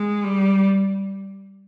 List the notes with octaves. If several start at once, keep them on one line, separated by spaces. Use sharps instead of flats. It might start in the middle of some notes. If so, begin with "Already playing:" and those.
Already playing: G#3
G3